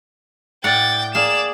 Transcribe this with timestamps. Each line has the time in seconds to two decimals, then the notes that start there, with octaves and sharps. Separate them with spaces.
0.64 A2 D5 F#5 G5 A6
1.15 A#3 G#4 D5 E7